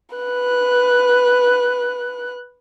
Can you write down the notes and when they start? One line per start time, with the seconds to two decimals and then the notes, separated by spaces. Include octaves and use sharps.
0.16 B4 F#6